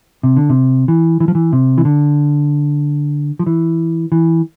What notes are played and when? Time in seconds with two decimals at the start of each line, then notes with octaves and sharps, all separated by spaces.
0.23 C3
0.36 D3
0.50 C3
0.88 E3
1.20 E3
1.28 F3
1.35 E3
1.53 C3
1.78 E3
1.85 D3
3.39 F3
3.46 E3
4.12 E3